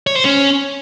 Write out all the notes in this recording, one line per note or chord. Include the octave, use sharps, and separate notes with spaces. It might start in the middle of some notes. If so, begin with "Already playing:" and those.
C#5
C5
C#4